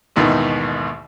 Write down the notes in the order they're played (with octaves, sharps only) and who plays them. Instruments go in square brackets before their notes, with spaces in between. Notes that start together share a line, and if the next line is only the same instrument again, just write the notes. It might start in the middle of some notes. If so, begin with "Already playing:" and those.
[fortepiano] A1 D#2 G#2 B2 D#3 E3